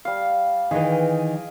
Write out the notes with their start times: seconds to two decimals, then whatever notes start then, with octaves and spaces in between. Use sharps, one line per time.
0.05 G3 F5
0.71 D#3 E3 G#4 D#5 G5